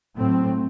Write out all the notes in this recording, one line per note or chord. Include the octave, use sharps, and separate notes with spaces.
A2 F#3 A3 C4